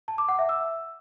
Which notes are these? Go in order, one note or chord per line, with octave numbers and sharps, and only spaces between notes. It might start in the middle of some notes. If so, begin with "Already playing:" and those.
A5
D6
F#5
E5
E6